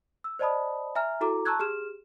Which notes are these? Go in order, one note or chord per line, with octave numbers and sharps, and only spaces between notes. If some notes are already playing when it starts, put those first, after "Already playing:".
E6
C5 D5 D#5 A5 B5 D#6
E5 G#5 A#5 F6
E4 F#4 A4 A#5 D6
A5 A#5 C#6 E6 F#6 G#6
G4 G#4 F6 E7